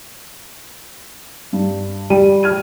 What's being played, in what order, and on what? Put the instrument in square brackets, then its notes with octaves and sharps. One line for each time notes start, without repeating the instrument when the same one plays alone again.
[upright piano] G2
[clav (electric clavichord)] G3 [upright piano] D#7
[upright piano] F6 G#6 D#7